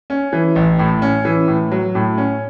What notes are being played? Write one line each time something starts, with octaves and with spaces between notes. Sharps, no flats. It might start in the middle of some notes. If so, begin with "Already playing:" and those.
C#4
E3
A1
A2
C#4
E3
A2
F#3
A2
C#4